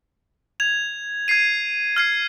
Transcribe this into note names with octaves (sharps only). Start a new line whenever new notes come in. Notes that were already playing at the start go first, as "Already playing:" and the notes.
G#6 F7
G#6 C7 D#7
F6 G#6 C7